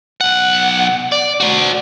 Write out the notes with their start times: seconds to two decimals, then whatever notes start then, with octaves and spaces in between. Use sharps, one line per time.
0.21 B1 F#5
1.12 D5
1.40 F#4 D5